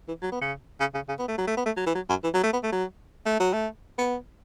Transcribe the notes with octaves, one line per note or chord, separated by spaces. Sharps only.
E3
F#3
B3
C#3
C#3
C#3
C#3
B3
A3
F#3
A3
B3
A3
F#3
E3
F#3
F#2
E3
F#3
A3
B3
A3
F#3
A3
F#3
A3
B3